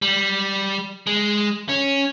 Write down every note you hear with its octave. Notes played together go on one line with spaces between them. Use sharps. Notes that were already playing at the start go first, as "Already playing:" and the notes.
G3
G#3
C#4